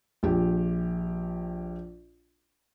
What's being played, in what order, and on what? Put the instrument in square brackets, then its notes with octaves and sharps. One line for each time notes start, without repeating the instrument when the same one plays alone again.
[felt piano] A#1 G4